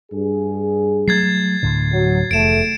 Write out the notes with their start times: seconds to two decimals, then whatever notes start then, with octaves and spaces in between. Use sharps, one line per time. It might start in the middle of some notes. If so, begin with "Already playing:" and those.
0.11 G2 G#4
1.08 F#3 A3 G#6 A6 C7
1.63 D2 A2 D3
1.92 F#3
2.31 F1 E2 A3 D7 E7